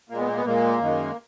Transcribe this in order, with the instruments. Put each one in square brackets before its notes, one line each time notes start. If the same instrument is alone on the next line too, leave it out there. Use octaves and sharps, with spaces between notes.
[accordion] A#2 G#3 A#3
B3
A#3
B3
A#2 G#3 A#3
F#2 D#3 G#3